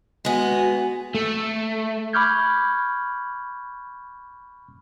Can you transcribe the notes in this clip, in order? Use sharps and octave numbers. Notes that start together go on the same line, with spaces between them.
G#3 B3 F#4 G#5
A3
B5 C#6 D6 F6 G6 G#6